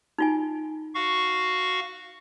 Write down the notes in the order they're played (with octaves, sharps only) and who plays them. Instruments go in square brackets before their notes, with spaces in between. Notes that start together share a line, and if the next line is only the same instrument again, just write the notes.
[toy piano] D#4 F4 G#5
[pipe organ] F#4 F5 C#6